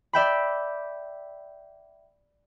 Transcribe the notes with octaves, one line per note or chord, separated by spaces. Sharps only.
D5 E5 G5 B5